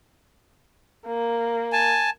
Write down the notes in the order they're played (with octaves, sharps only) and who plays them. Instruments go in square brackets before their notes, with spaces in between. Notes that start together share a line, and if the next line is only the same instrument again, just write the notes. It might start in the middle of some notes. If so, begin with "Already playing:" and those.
[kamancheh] A#3
[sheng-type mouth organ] G#5 A5